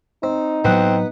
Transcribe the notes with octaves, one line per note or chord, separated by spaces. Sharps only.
C4 D#4
A2 F#3 B3 C4 B4 F#5